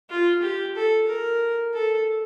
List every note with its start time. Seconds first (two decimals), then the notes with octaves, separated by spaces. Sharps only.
0.10 F4
0.42 G4
0.76 A4
1.08 A#4
1.74 A4